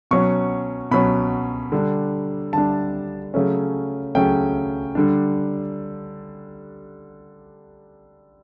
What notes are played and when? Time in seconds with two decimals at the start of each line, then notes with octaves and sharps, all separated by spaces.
0.11 B2 F#3 C#4 C#6
0.91 B2 F#3 C#4 B5
1.72 D3 G3 D4
2.53 D3 G3 D4 A5
3.34 C#3 F#3 A3 C#4
4.15 C#3 F#3 A3 C#4 G5
4.95 D3 G3 D4